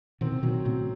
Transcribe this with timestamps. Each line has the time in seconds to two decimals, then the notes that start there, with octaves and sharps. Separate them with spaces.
0.21 B2 D#3 C4
0.32 C3
0.43 B2 D#3 F#3
0.65 A2 C3 F#3